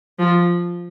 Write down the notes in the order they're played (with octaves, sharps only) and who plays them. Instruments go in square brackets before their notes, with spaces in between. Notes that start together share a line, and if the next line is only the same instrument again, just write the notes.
[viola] F3